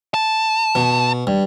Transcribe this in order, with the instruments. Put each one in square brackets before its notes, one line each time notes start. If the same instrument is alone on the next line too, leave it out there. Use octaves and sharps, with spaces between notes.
[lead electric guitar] A5
[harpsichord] B2
G2